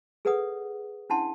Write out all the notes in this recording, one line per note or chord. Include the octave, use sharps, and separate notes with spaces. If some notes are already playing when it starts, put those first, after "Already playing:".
G#4 A4 B4 D5 F#5 D#6
C#4 D4 E4 F#5 A5 C6